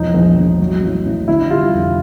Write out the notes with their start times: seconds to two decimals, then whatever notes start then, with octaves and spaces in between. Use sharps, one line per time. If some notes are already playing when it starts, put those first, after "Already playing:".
Already playing: E1 F3 D#4
0.14 A#1
0.37 A#1
0.60 F#3
0.82 A1
1.05 A1
1.28 D3 E4
1.50 G3 F4
1.73 F1